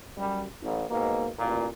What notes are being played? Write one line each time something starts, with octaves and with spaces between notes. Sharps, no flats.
F#2 G3
A1
G#2 B2 A#3
A1 A#2